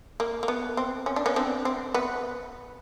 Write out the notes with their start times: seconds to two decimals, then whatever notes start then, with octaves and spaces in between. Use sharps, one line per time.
0.20 A#3
0.43 A#3
0.48 B3
0.77 C4
1.06 C#4
1.16 D4
1.26 B3 C#4
1.36 C4 D4
1.65 C4
1.94 B3